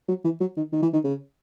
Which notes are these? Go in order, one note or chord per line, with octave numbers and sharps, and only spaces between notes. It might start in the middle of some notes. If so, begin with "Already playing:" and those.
F#3
E3
F#3
D#3
D#3
E3
D#3
C#3